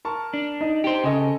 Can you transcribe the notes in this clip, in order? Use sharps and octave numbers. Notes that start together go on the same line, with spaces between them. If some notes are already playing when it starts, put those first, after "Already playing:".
A#4 A5 C#6
D4
D#4 D#5
G4 C5
C#3 A4 D#5 G#5